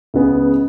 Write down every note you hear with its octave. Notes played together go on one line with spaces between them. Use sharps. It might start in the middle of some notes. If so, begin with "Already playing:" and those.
C#2 C#3 B3 G#4